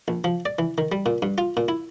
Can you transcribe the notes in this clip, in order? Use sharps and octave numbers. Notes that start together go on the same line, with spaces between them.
A#1
F3
D5
E3
D#3
G3
A#2
G2
F4
A#2
E4